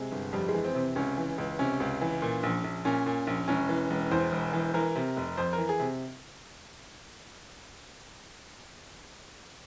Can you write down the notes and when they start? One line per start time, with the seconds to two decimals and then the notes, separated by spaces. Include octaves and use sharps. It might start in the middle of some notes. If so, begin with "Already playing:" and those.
Already playing: C3 G#3
0.12 G1
0.32 F2 G3
0.49 G#3
0.54 E3
0.65 C4
0.75 C3
0.95 C#2 C#4
1.17 E3
1.38 C#2
1.59 C3 C#4
1.80 C#2
2.01 E3
2.22 A#2
2.43 A#1
2.64 A#1
2.85 A#2 C#4
3.06 A#2
3.27 A#1
3.48 E1 C#4
3.69 E3
3.90 E1
4.11 E2 C5
4.32 E1
4.53 E3
4.74 E3 A#4
4.96 C3
5.16 F1
5.37 F2 C5
5.53 A#4
5.58 E3
5.69 G#4
5.80 C3